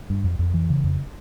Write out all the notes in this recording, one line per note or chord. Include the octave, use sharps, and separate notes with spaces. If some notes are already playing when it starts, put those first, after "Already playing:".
G2
F2
F2
E3
C#3
F2